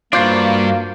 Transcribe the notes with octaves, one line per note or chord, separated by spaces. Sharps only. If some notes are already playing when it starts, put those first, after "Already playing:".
G2 A#3 D4 F4 F#4 C5 D5